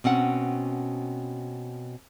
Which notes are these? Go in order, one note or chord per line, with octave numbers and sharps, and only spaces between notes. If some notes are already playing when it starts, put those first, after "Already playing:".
B2 C4 C#4 F#5